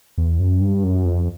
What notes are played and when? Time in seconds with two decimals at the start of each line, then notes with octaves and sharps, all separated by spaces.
0.18 E2
0.39 F#2
0.61 G2
0.84 F#2
1.05 F2